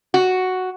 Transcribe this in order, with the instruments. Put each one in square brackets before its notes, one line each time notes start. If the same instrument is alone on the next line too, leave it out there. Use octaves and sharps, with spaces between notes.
[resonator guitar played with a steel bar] F#4